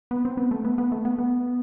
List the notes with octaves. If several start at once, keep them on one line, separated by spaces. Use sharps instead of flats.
B3
C4
B3
A3
B3
B3
A3
B3
B3